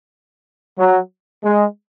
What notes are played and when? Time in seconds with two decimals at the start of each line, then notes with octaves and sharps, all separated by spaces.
0.78 F#3
1.44 G#3